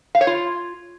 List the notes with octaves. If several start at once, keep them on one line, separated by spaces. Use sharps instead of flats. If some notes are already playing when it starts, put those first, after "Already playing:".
F5
C#5
F4